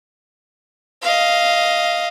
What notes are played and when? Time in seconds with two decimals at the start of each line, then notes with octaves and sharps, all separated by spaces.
1.02 D#5 F5